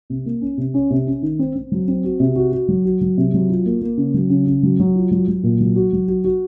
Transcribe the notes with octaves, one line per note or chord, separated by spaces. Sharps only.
C3
A#3
C#4
C3
C#4
C3
C#4
D#3
C4
C4
F#3
C4
F#4
C3
F#4
F#4
F#3
F#4
F#3
C3
F#3
F4
A#3
A#3
C#3
F#3
C#3
C#3
F#3
F#3
F4
F#3
F#3
A#2
F#3
F#4
F#3
F#4
F#4